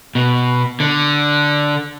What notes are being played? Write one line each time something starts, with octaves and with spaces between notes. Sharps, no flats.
B2
D3